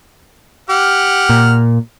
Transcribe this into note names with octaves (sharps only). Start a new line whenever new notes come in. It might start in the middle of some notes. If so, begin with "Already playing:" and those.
G4 F#5 F6
A#2